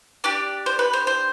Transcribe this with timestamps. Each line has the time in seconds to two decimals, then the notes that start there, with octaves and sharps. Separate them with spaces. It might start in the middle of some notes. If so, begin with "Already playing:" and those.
0.24 D4 G4 D5
0.66 C5
0.79 B4
0.93 C5
1.07 C5